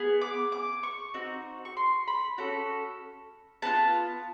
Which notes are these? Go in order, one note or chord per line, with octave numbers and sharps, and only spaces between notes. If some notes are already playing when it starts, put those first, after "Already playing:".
Already playing: B3 G#4
D6
D6
C#6
C4 D#4 F#4
C#6
C6
B5
C#4 F#4 A4
B3 D4 F4 A5